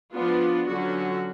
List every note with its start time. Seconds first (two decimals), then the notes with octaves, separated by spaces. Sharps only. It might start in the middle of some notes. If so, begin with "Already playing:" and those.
0.13 F3 B3 D4 F4
0.69 D3 F#3 C#4 F#4